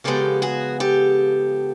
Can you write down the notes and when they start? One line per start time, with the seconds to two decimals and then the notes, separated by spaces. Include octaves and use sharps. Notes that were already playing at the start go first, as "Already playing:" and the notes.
0.04 C#3 F3 G#3 B3 G4 A4
0.42 F#4 G#4
0.80 G4 A4